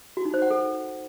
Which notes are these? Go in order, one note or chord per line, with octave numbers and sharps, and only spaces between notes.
F#4
D#4
C5
F#5
A4